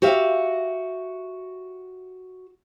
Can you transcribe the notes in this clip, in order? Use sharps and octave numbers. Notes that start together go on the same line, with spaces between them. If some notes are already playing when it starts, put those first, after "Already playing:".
F#4 G4 E5 F5